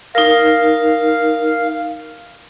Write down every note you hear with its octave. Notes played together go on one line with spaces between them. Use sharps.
D#4 A#4 F5